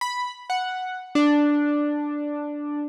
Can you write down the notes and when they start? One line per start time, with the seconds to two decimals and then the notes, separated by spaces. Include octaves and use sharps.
0.01 B5
0.50 F#5
1.15 D4